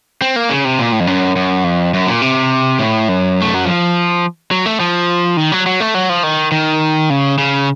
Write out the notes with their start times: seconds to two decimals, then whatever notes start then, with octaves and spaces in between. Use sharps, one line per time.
0.22 C4
0.36 A#3
0.50 C#3
0.65 C3
0.79 A#2
0.93 A2
1.00 F2
1.07 F#2
1.36 F#2
1.64 F2
1.94 F#2
2.07 A#2
2.22 C3
2.79 A2
3.08 F#2
3.42 A3
3.54 F#3
3.65 F3
4.51 F#3
4.66 A3
4.80 F3
5.37 D#3
5.52 F#3
5.66 F#3
5.80 A3
5.95 F#3
6.09 F3
6.23 D#3
6.52 D#3
7.10 C#3
7.38 C#3